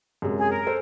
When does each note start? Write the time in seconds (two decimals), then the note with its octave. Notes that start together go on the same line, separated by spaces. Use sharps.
0.22 F#2 C3 G#3
0.37 G#4
0.50 A#4
0.67 A4 C5